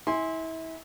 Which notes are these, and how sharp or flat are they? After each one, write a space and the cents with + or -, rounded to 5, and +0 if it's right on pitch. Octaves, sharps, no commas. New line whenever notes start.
E4 -30 G#5 -10 C6 +0